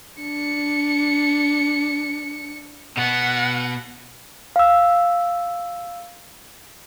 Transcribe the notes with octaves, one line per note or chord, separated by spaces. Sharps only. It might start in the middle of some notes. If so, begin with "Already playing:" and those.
D4 C#7
B2 B3 F#5
F5 E6